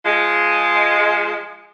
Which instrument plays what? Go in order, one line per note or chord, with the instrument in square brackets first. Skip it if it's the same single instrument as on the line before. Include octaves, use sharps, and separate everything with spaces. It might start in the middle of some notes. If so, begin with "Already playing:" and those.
[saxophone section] F3 G#3